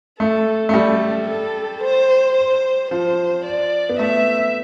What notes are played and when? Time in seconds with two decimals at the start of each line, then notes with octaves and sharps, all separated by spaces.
0.19 A3 A4
0.69 A3
0.73 G3 A4
1.28 A4
1.83 C5
2.37 C5
2.91 F3 C5
3.45 D5
3.89 B3
3.99 A3 E5